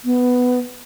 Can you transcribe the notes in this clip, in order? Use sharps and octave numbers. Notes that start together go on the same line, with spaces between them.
B3